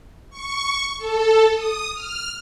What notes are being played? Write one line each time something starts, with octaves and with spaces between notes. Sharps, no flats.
C#6
A4
D#6
F6